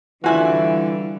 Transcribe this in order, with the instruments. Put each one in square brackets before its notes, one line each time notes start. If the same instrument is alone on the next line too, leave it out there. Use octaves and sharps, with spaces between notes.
[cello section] D3 G3 [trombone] E3 [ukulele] F4 E5 [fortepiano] F#4 G#5 F#6